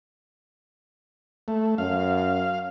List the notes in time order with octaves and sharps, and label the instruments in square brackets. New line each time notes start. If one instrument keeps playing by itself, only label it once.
[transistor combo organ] A3
[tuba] F#2 [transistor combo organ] F5